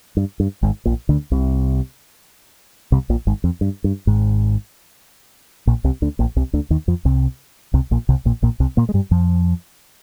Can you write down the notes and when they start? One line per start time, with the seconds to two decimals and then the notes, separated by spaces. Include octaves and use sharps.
0.17 G2
0.40 G2
0.63 G#1 G#2
0.86 A#1 A#2
1.09 D2 D3
1.32 C2 C3
2.92 C2 C3
3.09 A#1 A#2
3.27 G#1 G#2
3.44 F2
3.61 G2
3.84 G2
4.07 G#1 G#2
5.67 A#1 A#2
5.84 C2 C3
6.02 D2 D3
6.19 A#1 A#2
6.36 C2 C3
6.53 D2 D3
6.70 D#2 D#3
6.88 F2 F3
7.05 C2 C3
7.74 C2 C3
7.91 A#1 A#2
8.09 C2 C3
8.25 A#1 A#2
8.42 A#1 A#2
8.60 C2 C3
8.77 A#2 A#3
8.89 G#3
8.94 G2 G3
9.11 F2 F3